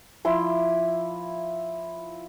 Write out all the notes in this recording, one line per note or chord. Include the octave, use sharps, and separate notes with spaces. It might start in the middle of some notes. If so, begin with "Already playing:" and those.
F3 E4 C6 D6